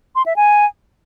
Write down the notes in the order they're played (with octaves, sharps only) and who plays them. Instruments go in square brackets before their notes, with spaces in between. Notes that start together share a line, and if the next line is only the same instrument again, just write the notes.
[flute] C6
E5
G#5